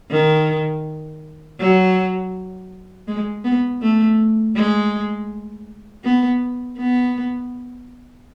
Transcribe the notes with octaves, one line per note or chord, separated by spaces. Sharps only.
D#3
F#3
G#3
B3
A3
G#3
B3
B3